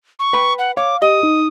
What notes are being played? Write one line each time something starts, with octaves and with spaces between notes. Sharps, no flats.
C#6
B4 G5 B5
F#5
C#5 F5 D6
G4 D#5 D#6
D#4